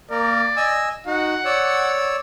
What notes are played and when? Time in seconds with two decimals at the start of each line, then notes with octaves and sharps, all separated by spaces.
0.10 A#3 A#4 D5
0.57 D#5 G#5 E6
1.07 D#4 F#4 F#5
1.45 C#5 D5 E6